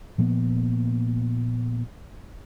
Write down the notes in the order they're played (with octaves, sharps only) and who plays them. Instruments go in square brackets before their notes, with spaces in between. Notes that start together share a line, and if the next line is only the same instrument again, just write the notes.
[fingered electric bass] A#2 F3 A#3 B3